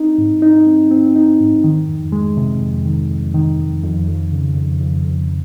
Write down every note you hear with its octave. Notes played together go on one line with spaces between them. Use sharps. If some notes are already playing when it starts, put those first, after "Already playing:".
Already playing: C4 D#4
G#2
D#4
C4
C4
D#4
G#2
D#3
F2
G#3
C3
F2
D#3
F2
D#3
F2
F2
F2
C#3
F2
F2
F2